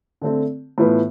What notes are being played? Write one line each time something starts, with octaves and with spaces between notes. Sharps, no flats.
D3 A3 C4
A2 E3 B3 F4 B4